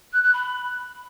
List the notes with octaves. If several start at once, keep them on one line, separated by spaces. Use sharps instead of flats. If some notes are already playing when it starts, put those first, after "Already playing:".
F#6
F#6
B5